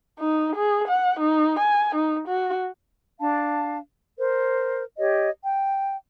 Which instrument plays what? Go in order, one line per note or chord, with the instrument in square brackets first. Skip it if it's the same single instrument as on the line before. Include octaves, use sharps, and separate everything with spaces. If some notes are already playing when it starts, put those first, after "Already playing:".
[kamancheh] D#4
G#4
F#5
D#4
G#5
D#4
F#4
[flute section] D4 F5 A5
A#4 C5
G4 C#5 D#5
G5